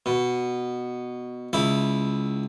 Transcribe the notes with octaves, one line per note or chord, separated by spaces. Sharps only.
B2
C#2 E4 D6